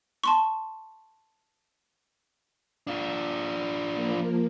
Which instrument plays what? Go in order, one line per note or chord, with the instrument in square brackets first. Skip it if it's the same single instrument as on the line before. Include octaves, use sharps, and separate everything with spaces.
[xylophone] A5 C6 C#6
[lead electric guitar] D4 F4
[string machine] F3 A#3